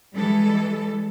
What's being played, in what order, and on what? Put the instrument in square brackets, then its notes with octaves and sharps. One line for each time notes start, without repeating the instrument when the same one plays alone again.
[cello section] E3 G3 G#3 A4